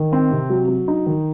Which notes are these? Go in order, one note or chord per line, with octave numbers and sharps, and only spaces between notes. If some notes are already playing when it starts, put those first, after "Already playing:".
Already playing: D#3
C4
C3
F#3
F#3
D#4
D#3